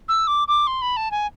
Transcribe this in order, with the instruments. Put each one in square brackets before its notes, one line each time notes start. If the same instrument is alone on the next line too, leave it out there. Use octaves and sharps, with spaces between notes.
[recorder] E6
D6
D6
C6
B5
A5
G#5